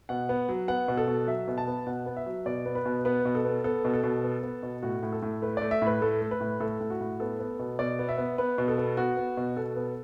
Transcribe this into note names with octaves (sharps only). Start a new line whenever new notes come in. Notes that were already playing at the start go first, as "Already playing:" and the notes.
B2 F#5
B3
F#3
B3 F#5
B2
A4
B2
F#3 E5
B2
A5
B3
B2 F#5
B3
E5
F#3
B2 D5
B3
B4
B2
B3 B4
B2
A4
B3
B3 A4
B2
A4
B2
B3
B3
B2
A2 F#4
A2
A4
A2
A3 B4
A3 D5
E5
A2 B4
A3 A4
A3
B4
A2
A2 A4
A2
F#4
A2
B3 A4
B3
B2
B2 D5
B3
E5
B3
B3 B4
B2
A4
B3
B3 F#4
B3
B2
B2 A4
B3